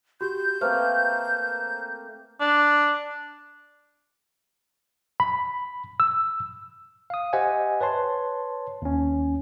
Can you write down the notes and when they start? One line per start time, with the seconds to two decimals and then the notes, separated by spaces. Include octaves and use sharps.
0.21 F#4 G4 G6
0.61 A3 A#3 C4 B4 C5 F6
2.40 D4
5.20 B5
6.00 E6
7.10 F5 D#6
7.33 G4 C5 D#5 E5 F#5 G#5
7.81 B4 C#5 A5 C6
8.82 D#2 C#4